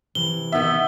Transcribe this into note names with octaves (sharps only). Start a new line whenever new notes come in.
C3 E3 G7
D#3 B3 E5